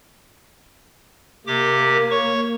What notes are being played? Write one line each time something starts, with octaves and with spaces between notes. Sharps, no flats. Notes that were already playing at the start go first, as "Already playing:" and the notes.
C3 A#3 G4 D6
C#5 C#6